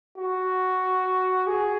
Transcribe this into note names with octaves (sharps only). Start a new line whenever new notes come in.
F#4
G#4